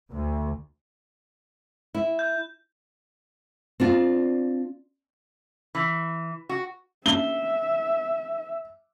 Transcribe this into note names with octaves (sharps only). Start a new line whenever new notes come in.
D2
E4
G6
C4 D4 F4
E3
F#4
A#3 C#4 D4 E5 G7